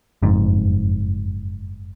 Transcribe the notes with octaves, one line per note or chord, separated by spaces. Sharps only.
F#1 F2 G#2